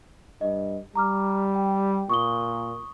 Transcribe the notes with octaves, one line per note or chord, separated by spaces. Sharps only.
G2 D#5
G3 A#5 D6 F6
G5
A#2 C#6 D#6 G7